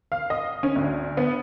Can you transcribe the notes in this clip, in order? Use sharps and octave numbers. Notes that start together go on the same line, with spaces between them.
F5
D#5
C#4
D2
B3